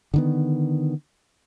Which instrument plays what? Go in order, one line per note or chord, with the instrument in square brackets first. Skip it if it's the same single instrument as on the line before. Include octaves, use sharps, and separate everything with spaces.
[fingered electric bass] D3 D#3 B3